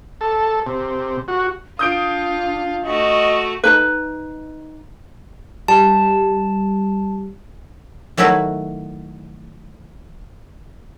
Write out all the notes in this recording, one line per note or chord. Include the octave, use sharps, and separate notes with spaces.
A4
C3
F#4
D4 F4 D#6 G6 D7
A3 F#4 D#5
D#4 B4
G3 A5
D#3 F#3 A3 E4 F#4 B4